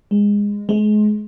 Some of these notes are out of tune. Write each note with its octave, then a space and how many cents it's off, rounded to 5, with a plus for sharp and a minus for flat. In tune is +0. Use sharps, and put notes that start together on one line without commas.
G#3 -20
G#3 +30